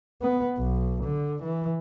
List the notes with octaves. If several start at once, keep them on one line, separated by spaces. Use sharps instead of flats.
B3
B1
D3
E3